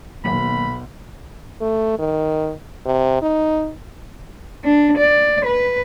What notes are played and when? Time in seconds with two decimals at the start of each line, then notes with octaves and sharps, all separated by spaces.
0.24 B1 D#3 F#3 A#3 B5
1.61 A3
1.99 D#3
2.86 C3
3.22 D#4
4.64 D4
4.97 D5
5.45 B4